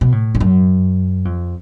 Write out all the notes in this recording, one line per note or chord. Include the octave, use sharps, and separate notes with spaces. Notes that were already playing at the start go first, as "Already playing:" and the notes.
B2
A2
G#2
F#2
F2